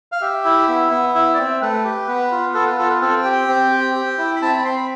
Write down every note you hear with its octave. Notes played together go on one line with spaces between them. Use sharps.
F5
G4 E5
E4
B3
B3
E4 E5
D5
C4 E5
A3 B4
G4
B3
F4
B3 A4
B4
F4 A4
B4
C4 A4
G5
G4
G5
C4
G4
G4
E4
B5
C4 A5
B5
C4 C6
B5